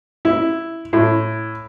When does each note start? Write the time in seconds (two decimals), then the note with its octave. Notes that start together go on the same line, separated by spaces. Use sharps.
0.25 E4
0.93 A2